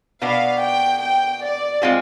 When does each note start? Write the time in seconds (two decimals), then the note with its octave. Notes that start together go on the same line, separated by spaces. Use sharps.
0.22 B2 B3 D4 F5
0.61 G5
1.01 G5
1.42 D5
1.82 G#3 C4 F4 G#4